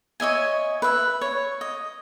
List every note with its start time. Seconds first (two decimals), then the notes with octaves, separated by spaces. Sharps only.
0.20 C#5 D#5 E5 G#5
0.82 B4 E5
1.21 C#5
1.61 D#5